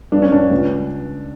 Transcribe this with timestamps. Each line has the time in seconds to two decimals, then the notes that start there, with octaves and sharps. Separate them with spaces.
0.12 G2 D4
0.22 C#4
0.32 G2 D4
0.51 C#2